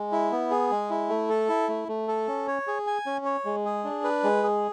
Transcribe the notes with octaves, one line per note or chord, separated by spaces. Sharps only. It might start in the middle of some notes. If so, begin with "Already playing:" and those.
Already playing: G#3
E4
B3
G#4
G#3
E4
A3
A4
E4
A3
A3
A4
C#4
C#5
G#4
G#5
C#4
C#5
G#3
G#4
D4
B4
G#3
G#4